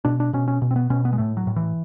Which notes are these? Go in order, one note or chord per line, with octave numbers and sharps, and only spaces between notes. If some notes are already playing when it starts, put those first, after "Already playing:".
B2 D4
D4
B2 C#4
C#4
B2
C4
B3
B2 C#4
B3
G#3
A2 A3
F#3
A2
E3